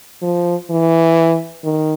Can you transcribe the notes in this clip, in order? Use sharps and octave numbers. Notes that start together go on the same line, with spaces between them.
F3
E3
D#3